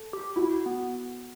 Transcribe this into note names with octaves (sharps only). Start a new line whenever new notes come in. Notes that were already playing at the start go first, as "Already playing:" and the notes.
Already playing: A4
G4
E4 F#4
B3